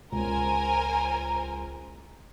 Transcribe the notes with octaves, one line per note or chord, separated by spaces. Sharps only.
C#2 A#4 C5 G#5 A#5